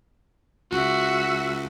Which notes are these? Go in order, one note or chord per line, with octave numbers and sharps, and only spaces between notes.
C#2 F#4 E5